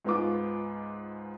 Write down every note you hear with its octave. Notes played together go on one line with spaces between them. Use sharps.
C#2 G#2 B3 F4 D6